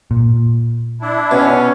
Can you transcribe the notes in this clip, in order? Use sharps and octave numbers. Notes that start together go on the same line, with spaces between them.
A#2
D4 E4
B2 C#4